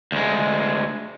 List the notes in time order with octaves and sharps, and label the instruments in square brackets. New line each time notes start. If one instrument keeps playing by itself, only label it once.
[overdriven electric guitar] D2 G#3